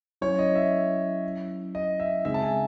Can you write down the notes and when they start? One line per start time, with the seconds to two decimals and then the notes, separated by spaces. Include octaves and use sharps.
0.21 F#3 C#4 E4 C#5
0.39 D#5
0.56 E5
1.75 D#5
2.00 E5
2.25 C#3 G#3 C4 D#4 G#4 E5
2.34 A5
2.42 G#5